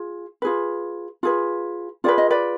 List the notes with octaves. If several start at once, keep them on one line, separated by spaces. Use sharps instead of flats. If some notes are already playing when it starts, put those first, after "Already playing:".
Already playing: F4 G#4
F4 G#4 B4
F4 G#4 B4
F4 G#4 B4 D5
D#5
B4 D5